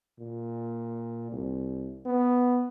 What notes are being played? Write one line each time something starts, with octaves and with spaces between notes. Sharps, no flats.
A#2
C2
B3